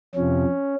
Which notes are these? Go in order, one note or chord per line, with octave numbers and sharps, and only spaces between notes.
F2 C3 F3 C#4